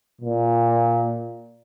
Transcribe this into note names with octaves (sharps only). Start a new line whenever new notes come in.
A#2